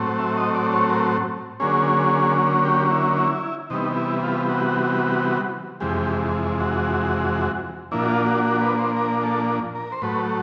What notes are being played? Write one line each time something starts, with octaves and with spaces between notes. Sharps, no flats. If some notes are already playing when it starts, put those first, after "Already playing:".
Already playing: A2 F#3 A3 C4
E5
D#5
D5
C#5
A#4
D3 F#3 A#3 C#4 G#4
G4
E4
E4
C3 E3 G3 B3 D#4
E4
F4
F#4
F2 C3 E3 G#3 G4
F#4
A#2 F3 A#3 D4 E4
F#4
F4
F#4
F#4
B4
C5
A#4
A4
A#4
C5
A2 F#3 A3 B4